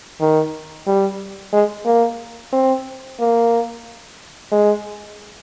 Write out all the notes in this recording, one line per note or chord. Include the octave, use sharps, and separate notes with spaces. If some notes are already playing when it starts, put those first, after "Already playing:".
D#3
G3
G#3
A#3
C4
A#3
G#3